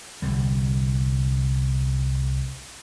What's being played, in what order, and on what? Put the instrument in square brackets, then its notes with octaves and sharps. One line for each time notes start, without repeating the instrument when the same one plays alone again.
[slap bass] C2 D3 G3